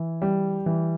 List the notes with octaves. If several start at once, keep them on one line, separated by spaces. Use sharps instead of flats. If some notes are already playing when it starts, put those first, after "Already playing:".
Already playing: E3
G3
E3